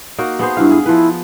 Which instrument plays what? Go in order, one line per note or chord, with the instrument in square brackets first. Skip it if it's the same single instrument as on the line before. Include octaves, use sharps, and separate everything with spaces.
[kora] A#3 D#4 F#4
B3 G#4 C5
[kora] G2 B4 F5 [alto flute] E4
[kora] G#4
[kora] F3 B4 [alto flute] E4